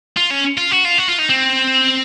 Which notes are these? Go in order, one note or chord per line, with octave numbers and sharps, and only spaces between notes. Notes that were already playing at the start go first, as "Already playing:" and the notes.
F4
C#4
F4
F#4
F4
F#4
F4
D#4
C4